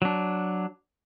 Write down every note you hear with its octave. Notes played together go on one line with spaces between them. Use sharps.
F#3 D4